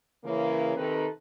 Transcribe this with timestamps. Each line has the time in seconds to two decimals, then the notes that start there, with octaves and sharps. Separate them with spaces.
0.24 C#3 E3 A#3
0.77 C3 D#3 C4 D#4 A4 B4